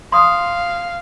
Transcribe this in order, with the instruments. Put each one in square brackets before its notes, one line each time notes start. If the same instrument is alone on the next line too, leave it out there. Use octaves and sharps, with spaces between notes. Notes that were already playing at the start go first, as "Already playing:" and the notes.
[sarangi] F5 [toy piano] C6 D#6